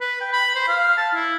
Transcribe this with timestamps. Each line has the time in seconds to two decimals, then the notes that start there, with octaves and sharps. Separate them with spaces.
0.01 B4
0.20 G5
0.33 B5
0.55 C5
0.68 F5
0.97 A5
1.15 E4